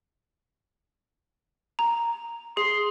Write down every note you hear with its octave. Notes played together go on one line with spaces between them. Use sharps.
A#5
G#4 C6